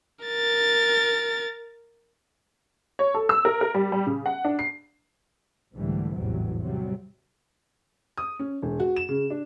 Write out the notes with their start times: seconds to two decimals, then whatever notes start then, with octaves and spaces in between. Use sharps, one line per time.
0.25 A#4 A6
2.99 C#5
3.14 A4
3.29 E6
3.45 A#4
3.61 A#4
3.74 G3
3.92 G3
4.07 C#3
4.26 F#5
4.45 D4
4.59 C7
5.75 C2 G#2 D3 E3 G3 A3
6.15 A1 E2 G#2 C3 F#3 G3
6.59 C3 F#3 G3
8.17 D#6
8.39 C#4
8.63 E1
8.80 F#4
8.96 E7
9.09 C#3
9.30 D4